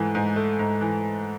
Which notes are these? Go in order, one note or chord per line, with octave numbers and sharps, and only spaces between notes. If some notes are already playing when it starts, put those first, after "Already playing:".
Already playing: G#2 E3 A3
G#2
A3
G#2
E3